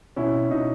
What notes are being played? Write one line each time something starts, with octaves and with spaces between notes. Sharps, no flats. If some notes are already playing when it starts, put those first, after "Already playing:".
B2 C#4 E4
B2
B2 D#4